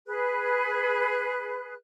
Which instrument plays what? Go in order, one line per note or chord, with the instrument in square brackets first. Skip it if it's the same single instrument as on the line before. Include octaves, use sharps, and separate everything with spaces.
[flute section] G#4 B4 F#6